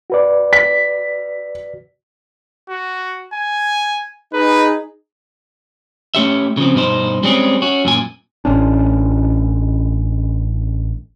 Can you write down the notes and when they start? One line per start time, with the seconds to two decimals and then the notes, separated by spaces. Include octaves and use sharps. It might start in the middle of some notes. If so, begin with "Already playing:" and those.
0.10 F#4 B4 D5
0.53 B6
2.70 F#4
3.34 G#5
4.34 D#4 G#4 B4
6.15 A3 C#4 G4 E5
6.57 C#3 F3 C4
6.75 G2 B2 D#4 C5
7.23 G3 G#3 C4 C#4 G4 G#4
7.62 C#4 F#4
7.85 F#2 A#2 G#5
8.45 A1 C#4 D4